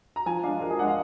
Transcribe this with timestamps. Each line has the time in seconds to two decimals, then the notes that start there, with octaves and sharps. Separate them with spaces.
0.16 A#5
0.26 F3 G#5
0.43 G#3 D4 F5
0.61 F3 A#4
0.70 G#4
0.79 G#3 D4 F#5
0.88 F5